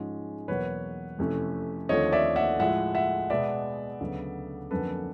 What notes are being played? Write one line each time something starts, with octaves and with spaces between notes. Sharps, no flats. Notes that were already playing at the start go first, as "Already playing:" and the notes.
Already playing: G#2 F3 G#3 C#4
E2 B2 F#3 A#3 B4 C#5
F2 C3 E3 A3 C#4
D#2 D3 F3 A3 C4 C#5 D#5
D5 E5
E5 F#5
A2 F3 G#3 E5 F#5
E5 F#5
B2 G#3 B3 D5 E5
D2 C#3 F#3 B3
F2 D3 F#3 A#3 C#4 A4 B4